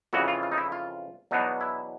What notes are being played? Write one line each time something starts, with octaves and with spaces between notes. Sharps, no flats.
F2 C#3 E3 F#4
F4
F4
D#4
E4
F4
E2 B2 F#3 B3 D4 D#4
E4